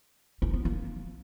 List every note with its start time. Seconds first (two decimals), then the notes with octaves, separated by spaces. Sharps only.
0.42 D#4
0.54 B3
0.65 A#3